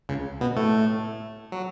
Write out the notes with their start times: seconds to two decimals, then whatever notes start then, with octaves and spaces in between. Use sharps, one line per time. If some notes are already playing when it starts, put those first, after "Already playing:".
0.09 C#2 C#3
0.41 B2 B3
0.56 A2 A3
1.52 F#3